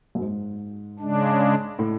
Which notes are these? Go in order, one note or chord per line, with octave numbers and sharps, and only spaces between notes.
F#2
G#2
C#3 G#3 D4
A2